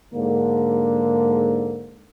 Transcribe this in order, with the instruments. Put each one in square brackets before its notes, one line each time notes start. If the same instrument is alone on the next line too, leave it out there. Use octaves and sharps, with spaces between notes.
[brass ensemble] G#2 D3 A#3